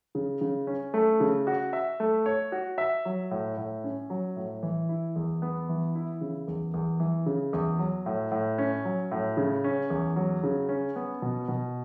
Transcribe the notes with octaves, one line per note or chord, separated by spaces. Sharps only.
C#3
C#3
C#4
A3
C#3
F#4
E5
A3
C#5
F#4
E5
F#3
A2
A2
C#4
F#3
A2
E3
E4
E2
B3
E3
E4
C#3
E2
E2
E3
C#3
E2
F#3
A2
A2
C#4
F#3
A2
C#3
C#4
E2
F#3
C#3
C#4
B3
B2
B2